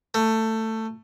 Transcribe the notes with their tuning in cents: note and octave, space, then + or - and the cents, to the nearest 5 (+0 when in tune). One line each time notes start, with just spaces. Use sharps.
A3 +15